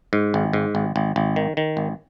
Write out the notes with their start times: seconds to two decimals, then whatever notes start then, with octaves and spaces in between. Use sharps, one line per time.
0.13 G#2
0.34 G#1
0.53 G#2
0.75 G#1
0.96 G#1
1.16 G#1
1.36 D#3
1.57 D#3
1.77 G#1